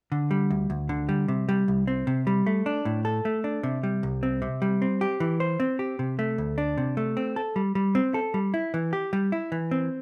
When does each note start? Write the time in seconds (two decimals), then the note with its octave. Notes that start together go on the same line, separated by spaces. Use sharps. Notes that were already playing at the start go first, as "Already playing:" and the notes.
0.12 D3
0.31 G3
0.50 D2
0.70 D2
0.89 D3
1.09 G3
1.28 C3
1.49 G3
1.68 C2
1.87 C4
2.07 C3
2.27 G3
2.46 A3
2.66 D4
2.85 A2
3.05 A4
3.25 A3
3.44 D4
3.63 C3
3.83 G3
4.03 C2
4.23 C4
4.42 C3
4.62 G3
4.82 C4
5.01 G4
5.20 E3
5.40 C5
5.60 C4
5.79 G4
5.99 C3
6.19 A3
6.38 D2
6.58 D4
6.78 C3
6.97 A3
7.17 C4
7.36 A4
7.56 G3
7.75 G3
7.95 C4
8.14 A4
8.34 G3
8.54 E4
8.74 E3
8.93 G4
9.13 G3
9.32 E4
9.52 E3
9.71 C4